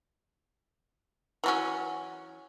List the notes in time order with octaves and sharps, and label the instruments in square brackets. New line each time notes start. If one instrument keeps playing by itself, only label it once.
[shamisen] E3 F#3 C#4